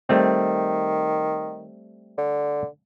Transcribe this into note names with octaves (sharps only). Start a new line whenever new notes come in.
D#3 G3 A3 C4
D3